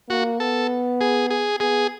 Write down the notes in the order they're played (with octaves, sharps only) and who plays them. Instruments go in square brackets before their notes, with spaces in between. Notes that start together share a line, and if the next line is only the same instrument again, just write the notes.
[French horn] A#3 [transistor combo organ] F#4
[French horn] B3 [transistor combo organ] A4
[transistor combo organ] G#4
G#4
[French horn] B3 [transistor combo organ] G#4